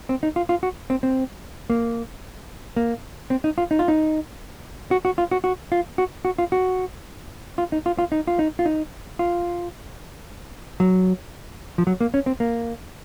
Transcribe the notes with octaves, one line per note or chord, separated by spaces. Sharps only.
C4
D#4
F4
F4
F#4
C4
C4
A#3
A#3
C4
D#4
F4
D#4
F4
D#4
F#4
F#4
F4
F#4
F#4
F4
F#4
F#4
F4
F#4
F4
D#4
F4
F4
D#4
F4
D#4
F4
D#4
F4
F#3
F3
F#3
A#3
C#4
C4
A#3